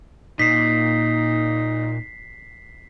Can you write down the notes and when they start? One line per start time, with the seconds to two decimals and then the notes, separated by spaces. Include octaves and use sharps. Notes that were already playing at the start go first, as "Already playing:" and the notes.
0.39 A#2 D#4 B6 C7